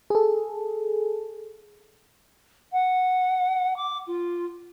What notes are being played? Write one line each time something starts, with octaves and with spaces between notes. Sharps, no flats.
G#4 A4
F#5
D6
F4